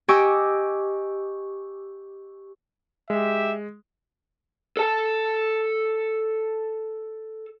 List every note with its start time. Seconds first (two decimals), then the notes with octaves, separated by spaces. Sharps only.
0.08 G4 D#5 G#5 C#6 D6 E6
3.10 G#3 G4 E5
4.77 A4 A5